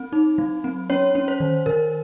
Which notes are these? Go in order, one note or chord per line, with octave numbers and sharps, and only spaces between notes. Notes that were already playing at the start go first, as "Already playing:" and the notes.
Already playing: C4
D#4
F#3
C4
C#4 C#5
C#4
C5
D#3
D#3 A#4